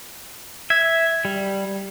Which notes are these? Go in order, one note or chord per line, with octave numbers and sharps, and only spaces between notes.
E5 G#6
G3